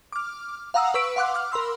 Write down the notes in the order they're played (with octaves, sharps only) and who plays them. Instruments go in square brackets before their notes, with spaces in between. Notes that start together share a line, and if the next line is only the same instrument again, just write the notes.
[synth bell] D6 F6
F5 F#5 A#5 D#6 E6
B4 C#6 E6 B6 D7
F5 F#5 C6 D6 F#6
D6 F6
A#4 B5 C6 E6